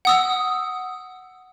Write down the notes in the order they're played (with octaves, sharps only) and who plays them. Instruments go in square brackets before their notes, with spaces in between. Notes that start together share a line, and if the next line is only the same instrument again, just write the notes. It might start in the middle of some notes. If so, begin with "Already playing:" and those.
[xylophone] F#5 D#6 E6